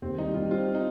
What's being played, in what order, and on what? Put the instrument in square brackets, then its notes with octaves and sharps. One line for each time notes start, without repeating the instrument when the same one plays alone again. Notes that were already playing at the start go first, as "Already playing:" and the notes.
[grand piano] D#2 [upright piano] C4
[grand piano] G3 [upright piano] D#4
[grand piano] G3 [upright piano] F4
[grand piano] C4 [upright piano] F4
[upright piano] D#4